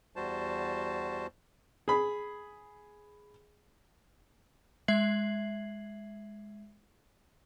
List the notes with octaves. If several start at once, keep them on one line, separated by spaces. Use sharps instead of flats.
E2 G3 F#4 C5 A5
G#4 B5
G#3 E5 G#6 C7 F#7